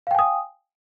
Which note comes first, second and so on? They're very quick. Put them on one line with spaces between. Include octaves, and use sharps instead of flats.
F5 G5 G#5 D#6